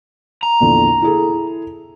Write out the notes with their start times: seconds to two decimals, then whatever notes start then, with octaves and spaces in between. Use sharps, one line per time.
0.43 A#5
0.60 A#1 E2 D3
1.02 E4 G#4 A4